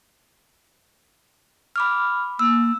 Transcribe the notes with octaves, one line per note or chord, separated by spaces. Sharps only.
B5 D6 F6
A#3 E6